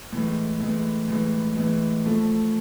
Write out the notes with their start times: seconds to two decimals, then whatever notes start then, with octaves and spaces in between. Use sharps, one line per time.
0.13 A2 E3 G#3
0.60 A2 E3 G#3
1.08 A2 E3 G#3
1.56 A2 E3 G#3
2.04 A2 F3 A3